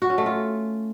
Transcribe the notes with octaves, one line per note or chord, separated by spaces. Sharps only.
F#4
C#4
A3
F4